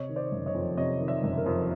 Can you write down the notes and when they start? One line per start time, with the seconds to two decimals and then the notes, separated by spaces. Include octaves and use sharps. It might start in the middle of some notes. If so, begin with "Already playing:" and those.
Already playing: C3 C#5 D#5
0.09 D#3
0.16 C5 D5
0.32 F#1
0.46 C#5 D#5
0.55 F2
0.77 C3 C#5 D#5
1.01 D#3
1.08 D5 E5
1.23 F#1
1.38 A#4
1.46 F2